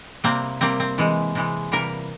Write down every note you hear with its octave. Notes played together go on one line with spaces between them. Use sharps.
C3 G3 A#3 C4
C3 G3 A#3 C4
C4
C3 E3 G#3
C3 E3 G#3
C3 E3 G3 A#3 A#4